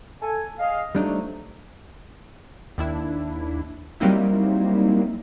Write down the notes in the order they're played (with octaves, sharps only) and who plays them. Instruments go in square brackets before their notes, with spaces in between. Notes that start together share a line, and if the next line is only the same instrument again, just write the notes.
[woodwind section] A4 G#5
G#4 D#5 F5
[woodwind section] F2 F#3 A3 [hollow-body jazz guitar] G3 D4 D#4
[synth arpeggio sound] D#2 D4 E4
F#3 G3 A#3 C4 D#4 E4